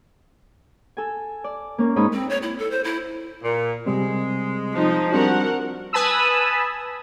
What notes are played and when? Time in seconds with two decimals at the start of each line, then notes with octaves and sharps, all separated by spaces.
0.97 A4 G#5
1.44 D5
1.78 A#3 C#4 A#4
1.96 G#2 D#4 C#5 A#5 B5 D#6
2.13 C4
2.30 C#5
2.43 E4
2.59 A4
2.71 C5
2.84 E4
3.44 A#2
3.86 C3 G3 G#3 C4
4.74 F3 D#4
5.13 G3 C4 D4 F#4 A#4 F#5
5.93 B4 G#5 A5 B5 D#6 E6